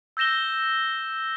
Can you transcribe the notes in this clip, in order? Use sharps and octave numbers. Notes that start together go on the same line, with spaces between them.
E6 G6 A#6 E7 G7